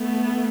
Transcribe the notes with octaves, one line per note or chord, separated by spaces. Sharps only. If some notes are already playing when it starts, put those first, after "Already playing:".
Already playing: A3 B3